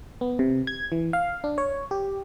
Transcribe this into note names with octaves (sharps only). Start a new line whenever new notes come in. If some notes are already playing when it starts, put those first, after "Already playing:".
B3
C3
G#6
E3
F5
D4
C#5
G4